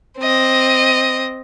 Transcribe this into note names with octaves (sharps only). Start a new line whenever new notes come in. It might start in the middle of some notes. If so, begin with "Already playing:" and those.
C4 D#5